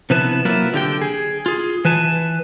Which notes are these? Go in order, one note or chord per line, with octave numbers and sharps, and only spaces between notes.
C3 F3 B3 E4 B4 A5
F#3 A#3 E4 F4 B4
D3 G4 G5
G#4
F4 G#4
E3 B4 G#5 A5